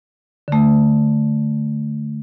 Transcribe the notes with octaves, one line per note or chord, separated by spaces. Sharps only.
D3 A3